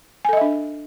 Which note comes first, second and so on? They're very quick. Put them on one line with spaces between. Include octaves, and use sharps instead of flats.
G#5 A4 D#5 E5 D4